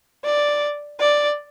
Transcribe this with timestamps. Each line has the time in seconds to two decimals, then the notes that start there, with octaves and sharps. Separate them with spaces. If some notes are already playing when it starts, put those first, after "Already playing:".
0.25 D5
1.00 D5